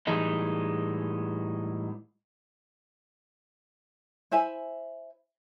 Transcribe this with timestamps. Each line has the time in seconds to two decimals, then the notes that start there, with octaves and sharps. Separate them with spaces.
0.07 A2 E3 G3 G#3 D#4
4.31 E4 C5 E5 G#5